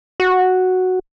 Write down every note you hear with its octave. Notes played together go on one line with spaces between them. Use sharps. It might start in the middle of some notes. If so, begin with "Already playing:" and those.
F#4